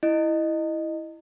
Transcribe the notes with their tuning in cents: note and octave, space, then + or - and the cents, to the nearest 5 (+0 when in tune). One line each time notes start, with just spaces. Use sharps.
E4 +0 D#5 -15